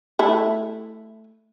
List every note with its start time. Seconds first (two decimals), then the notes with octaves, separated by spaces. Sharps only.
0.19 A3 E4